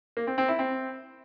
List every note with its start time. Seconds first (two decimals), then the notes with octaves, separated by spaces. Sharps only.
0.17 A#3
0.27 C4
0.38 C4
0.48 E4
0.59 C4